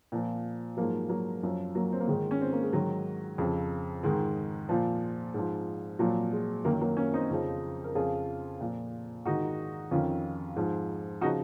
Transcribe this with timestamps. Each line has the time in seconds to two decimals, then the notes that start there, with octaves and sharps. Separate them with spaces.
0.12 A#2 F3
0.77 G#2 F3 F#3 A#3
1.09 F#3 A#3
1.43 F#2 F3
1.75 F#3 A#3
1.93 C4
2.00 A#3
2.08 G#2 D#3 G#3
2.31 C#4
2.41 C4
2.53 A#3
2.63 G#3
2.73 G#2 D#3 F#3
3.38 F2 C#3 F3
4.03 G#2 D#3 G#3
4.69 A#2 F3
5.34 G#2 F3
5.99 A#2 F3 F#3
6.32 G#3
6.65 F#2 D#3 F#3 A#3
6.81 F#3 A#3
6.97 A#3 C#4
7.14 C4 D#4
7.31 F2 C#3 F3
7.84 A#4
7.95 F2 C#3 F3 F4 G#4
8.61 A#2 F3
9.25 G#2 D#3 D#4 F#4
9.91 F2 D#3 C#4 F4
10.56 G#2 F3
11.21 C#3 F3 D#4 F#4